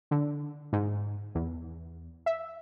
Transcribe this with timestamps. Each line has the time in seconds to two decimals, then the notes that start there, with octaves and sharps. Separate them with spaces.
0.11 D3
0.73 G#2
1.35 E2
2.26 E5